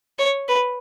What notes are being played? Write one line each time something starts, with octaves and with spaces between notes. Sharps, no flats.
C#5
B4